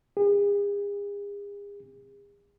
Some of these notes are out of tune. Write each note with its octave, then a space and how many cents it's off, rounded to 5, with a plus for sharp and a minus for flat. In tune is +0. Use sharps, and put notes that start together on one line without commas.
G#4 -40